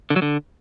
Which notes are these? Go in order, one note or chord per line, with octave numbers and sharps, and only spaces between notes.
D3
F#3
D3